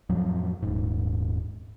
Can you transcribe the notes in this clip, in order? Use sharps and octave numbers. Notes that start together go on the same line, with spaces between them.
F2 A2 F3 F#3
D#1 G#2